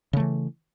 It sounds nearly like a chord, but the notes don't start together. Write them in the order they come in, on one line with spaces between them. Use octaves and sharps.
C#3 A3 E3